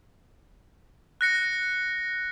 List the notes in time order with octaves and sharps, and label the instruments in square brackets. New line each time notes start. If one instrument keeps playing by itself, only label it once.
[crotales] F#6 A#6 C#7